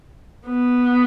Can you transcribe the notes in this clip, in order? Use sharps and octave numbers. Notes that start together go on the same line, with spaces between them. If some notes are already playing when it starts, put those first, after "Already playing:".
B3